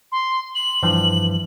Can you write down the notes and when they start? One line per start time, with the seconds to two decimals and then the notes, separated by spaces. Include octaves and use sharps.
0.12 C6
0.55 F#7
0.83 G2 E3 F3